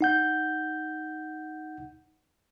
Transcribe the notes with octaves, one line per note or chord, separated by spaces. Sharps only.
D#4 F#5 G6